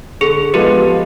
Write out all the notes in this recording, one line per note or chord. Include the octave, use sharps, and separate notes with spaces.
D3 G#4
F3 G#3 B3 G4 A4
F3